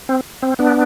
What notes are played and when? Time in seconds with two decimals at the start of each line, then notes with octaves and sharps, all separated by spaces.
0.09 C4
0.42 C4
0.59 B3 D4